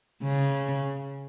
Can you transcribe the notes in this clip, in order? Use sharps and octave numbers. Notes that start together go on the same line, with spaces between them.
C#3